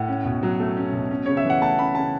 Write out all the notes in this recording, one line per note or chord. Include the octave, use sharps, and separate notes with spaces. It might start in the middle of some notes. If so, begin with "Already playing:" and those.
Already playing: A2 F#5
C#4
B2
F#3
A3
C#4
B2
C#4
C#3 C#5
E5
E3
F#5
A3 A5
C#4 B5
C#3 A5